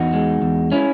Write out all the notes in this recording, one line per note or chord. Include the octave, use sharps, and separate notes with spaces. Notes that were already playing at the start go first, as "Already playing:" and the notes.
Already playing: E2 D#4 F#4
G#3
E2
C#4 E4